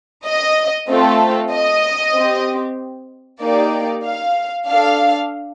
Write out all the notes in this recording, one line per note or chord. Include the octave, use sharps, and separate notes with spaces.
D#5
A3 C4 F4 A4
D#5
C4 G4
A#3 D#4 G4 D5
F5
D4 A4 F5